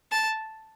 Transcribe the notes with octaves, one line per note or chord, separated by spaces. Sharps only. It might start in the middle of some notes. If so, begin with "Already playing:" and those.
A5